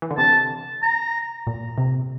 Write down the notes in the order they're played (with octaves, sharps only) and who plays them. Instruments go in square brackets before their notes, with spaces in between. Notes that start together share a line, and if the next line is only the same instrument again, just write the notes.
[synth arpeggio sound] E3
D3
[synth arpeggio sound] C3 [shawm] A5
[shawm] A#5
[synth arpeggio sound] A#2
C3